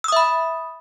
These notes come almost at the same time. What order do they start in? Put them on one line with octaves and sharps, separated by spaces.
E6 D#6 E5 B5